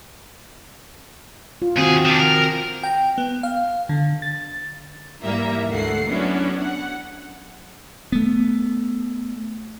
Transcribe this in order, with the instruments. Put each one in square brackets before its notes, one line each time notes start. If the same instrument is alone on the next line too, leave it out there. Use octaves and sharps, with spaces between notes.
[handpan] F4
[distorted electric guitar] D#2 G#4 [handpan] D#3 C4 F#4
[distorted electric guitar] F3 D4
A#4
[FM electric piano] G5
B3
F5
D3
A6
[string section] G#2 E3 G3 A#3 E5 A#5
D2 G#2 A3 F#5 C7
F#3 B3 C#4 D4 E4 F#4
F#5
[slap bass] A3 B3